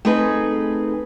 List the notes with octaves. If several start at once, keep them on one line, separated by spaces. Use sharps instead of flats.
A3 C4 D#4 G#4 B4